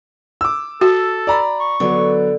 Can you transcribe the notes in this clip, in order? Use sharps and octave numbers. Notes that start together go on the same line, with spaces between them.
D6 E6
F#4 A4
D5 A#5 B5
C#6
D3 F#3 B3